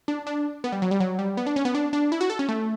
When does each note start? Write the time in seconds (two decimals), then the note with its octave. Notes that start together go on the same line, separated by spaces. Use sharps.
0.08 D4
0.27 D4
0.64 B3
0.72 G3
0.82 F#3
0.91 G3
1.00 F#3
1.19 G3
1.37 B3
1.47 D4
1.56 C#4
1.65 B3
1.75 D4
1.93 D4
2.12 E4
2.21 F#4
2.30 A4
2.39 C#4
2.49 A3